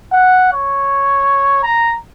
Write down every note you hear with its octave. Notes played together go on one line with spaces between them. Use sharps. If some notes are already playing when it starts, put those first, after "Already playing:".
F#5
C#5
A#5